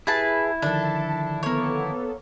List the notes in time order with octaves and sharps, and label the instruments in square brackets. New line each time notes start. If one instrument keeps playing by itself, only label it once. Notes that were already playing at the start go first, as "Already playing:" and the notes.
[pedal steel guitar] E4 [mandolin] G#4 B4 A5
[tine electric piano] D3 D#3 F3 [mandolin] D4 A4 [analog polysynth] A5
[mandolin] A#3 C#5 [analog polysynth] B3 A4